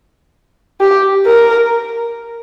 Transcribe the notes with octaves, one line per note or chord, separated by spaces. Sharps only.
G4
A#4